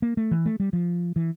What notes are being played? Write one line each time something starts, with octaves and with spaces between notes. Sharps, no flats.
A#3
A3
E3
A3
G3
F3
E3